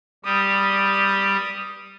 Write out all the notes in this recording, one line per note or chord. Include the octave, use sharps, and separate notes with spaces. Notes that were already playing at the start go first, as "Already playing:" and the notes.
G3 G4 D#6